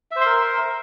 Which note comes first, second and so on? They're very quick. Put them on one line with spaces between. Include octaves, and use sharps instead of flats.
E5 C5 C6 A#4